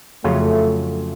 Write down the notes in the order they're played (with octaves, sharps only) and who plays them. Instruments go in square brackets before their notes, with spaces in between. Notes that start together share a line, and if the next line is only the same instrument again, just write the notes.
[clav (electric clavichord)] F2 C#3 F#3 C#4 F4 [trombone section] A3